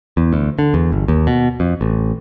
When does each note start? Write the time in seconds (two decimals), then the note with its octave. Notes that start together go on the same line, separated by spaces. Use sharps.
0.17 E2
0.33 D2
0.59 D3
0.74 E2
0.92 G1
1.08 D#2
1.27 B2
1.60 F2
1.81 A1